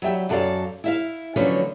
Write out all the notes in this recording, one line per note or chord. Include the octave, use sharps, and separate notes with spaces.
F#3 G3 E5 G5
F#2 F#3 A4 D5 F5 A5
E4 E5 F5
D3 F3 F#3 A3 C#4 B4